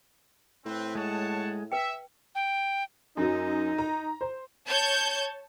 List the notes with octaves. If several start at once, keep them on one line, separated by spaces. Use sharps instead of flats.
A2 C4 B4
G#3 C#5 F#5 A5
B4 E5 G5
G5
F#2 F#3 D#4
A#5
C5
C#5 A5 G6 G#6